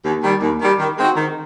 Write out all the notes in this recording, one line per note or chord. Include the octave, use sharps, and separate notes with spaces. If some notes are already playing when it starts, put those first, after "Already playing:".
D#2
D#3 G3
D#2
D#3 G3
D#3
G#3 C4 D#4 F#4
D#3